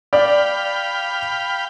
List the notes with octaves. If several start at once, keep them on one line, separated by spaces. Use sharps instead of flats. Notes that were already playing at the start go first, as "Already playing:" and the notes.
D5 F5 G5 B5